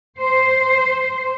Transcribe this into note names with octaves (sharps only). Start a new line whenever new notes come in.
C5